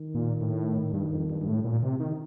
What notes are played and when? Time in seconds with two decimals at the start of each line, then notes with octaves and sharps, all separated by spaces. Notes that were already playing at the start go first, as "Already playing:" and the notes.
Already playing: D#3
0.15 A#2
0.41 A2
0.93 G2 D#3
1.12 F2
1.30 G2
1.41 G2
1.48 A2
1.64 A#2
1.83 C3
2.00 D#3